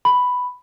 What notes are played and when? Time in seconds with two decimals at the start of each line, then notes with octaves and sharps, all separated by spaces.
0.05 B5